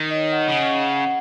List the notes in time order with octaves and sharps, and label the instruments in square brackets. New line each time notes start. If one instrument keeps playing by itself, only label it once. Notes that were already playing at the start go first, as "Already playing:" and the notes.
Already playing: [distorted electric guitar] D#3
[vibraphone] D#5
C#5
F#5
[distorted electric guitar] C#3
[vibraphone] F#5